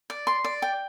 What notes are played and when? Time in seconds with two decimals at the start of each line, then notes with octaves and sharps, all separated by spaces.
0.10 D5
0.27 C6
0.44 D5
0.62 G5